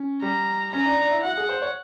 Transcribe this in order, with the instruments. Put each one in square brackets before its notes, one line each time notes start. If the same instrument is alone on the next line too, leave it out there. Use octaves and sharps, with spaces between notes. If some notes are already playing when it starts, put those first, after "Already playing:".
Already playing: [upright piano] C#4
[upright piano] G3 [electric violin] A#5
[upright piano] C#4 [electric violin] A#5
[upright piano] D4
D4
E4
[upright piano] F#4 [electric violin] F#5
[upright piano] G#4
C5
C#5